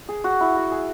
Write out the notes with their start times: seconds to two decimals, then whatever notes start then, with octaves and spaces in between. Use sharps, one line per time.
0.09 G#4
0.24 F#4
0.41 E4
0.56 F#4
0.71 G#4